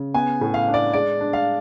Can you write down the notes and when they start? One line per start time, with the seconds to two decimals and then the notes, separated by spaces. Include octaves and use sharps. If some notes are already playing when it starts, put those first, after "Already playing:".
Already playing: C#3
0.14 B3 G#5
0.41 A2
0.54 F5
0.68 D4
0.74 D5
0.93 G#3 D5
1.20 D4
1.33 F5